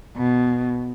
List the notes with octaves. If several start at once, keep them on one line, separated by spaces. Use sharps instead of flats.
B2